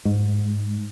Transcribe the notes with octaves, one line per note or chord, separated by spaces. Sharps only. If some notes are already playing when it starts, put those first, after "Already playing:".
G#2